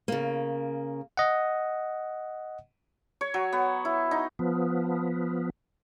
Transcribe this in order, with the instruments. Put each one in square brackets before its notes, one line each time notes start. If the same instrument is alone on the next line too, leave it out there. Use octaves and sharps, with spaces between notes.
[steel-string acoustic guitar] C#3 A#3
[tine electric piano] D#5 F#5
[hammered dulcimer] C#5
F#3
B3
E4
D#4
[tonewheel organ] F3 B3